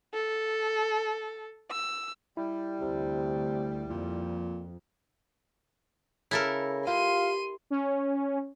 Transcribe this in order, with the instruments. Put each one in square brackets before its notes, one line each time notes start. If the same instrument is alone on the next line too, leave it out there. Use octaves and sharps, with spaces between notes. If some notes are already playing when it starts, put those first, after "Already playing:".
[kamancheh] A4
E6
[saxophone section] G3 [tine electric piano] E4
[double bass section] D2 [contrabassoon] C3
[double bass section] F2 [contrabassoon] A#2
[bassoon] C#3 [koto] E4 A4 A#4
[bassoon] F4 [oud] G4 [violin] C6 D#7
[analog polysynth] C#4